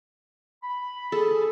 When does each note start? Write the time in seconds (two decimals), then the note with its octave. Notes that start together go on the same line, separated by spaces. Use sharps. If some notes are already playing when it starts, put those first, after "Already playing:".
0.63 B5
1.12 G#4 A4